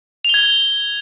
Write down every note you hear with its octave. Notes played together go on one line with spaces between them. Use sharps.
G#6 F7 G7